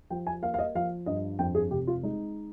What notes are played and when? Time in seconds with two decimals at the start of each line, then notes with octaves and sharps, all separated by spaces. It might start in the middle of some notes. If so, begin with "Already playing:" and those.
0.10 F3 G5
0.27 G#5
0.42 A#3 F5
0.54 F5
0.59 D#5
0.75 F3 F5
1.06 G2 D#5
1.39 F2 G5
1.55 G#4
1.71 F1 G4
1.87 F4
2.03 G#3 D#4